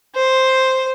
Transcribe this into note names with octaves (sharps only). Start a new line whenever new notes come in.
C5